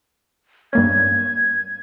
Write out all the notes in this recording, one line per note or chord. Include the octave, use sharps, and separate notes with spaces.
G2 A#3 C#4 G#6